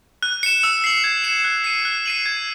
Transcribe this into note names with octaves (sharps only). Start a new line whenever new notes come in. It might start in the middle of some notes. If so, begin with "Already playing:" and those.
F#6
C#7 E7
E6
C7 F#7
G#6
C#7 E7
F#6
C7 D#7
F#6
C7 D#7 F#7
G#6